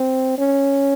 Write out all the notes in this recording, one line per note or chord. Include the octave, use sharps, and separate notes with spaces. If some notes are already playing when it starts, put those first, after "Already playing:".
Already playing: C4
C#4